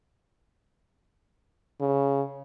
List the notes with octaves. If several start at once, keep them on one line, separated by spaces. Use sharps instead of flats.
C#3